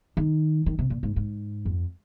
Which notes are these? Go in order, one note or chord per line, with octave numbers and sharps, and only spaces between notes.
D#3
D#3
C3
A#2
G#2
G#2
F2